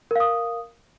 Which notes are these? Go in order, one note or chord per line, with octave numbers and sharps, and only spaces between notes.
A#4 F5 D#6